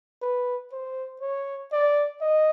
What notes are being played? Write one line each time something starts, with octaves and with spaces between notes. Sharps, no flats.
B4
C5
C#5
D5
D#5